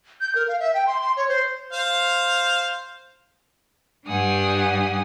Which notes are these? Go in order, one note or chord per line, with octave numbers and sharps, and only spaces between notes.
G6
A#4
F5
E5
G5
C6
C6
C#5
C5
C5 F5
G2 D4 G4 F#5 G#5 D#6